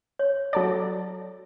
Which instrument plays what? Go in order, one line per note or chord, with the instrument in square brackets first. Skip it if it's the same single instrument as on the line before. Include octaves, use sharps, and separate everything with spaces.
[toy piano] C#5
[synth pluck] F#3 A4 D5